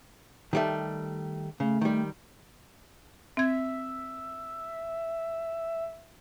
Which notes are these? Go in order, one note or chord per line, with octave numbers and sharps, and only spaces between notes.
D#3 G3 A3
C#3 A3
D#3 G3
C4 E5 G#6